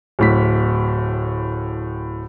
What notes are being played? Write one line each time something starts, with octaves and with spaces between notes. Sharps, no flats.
D1 A2 B6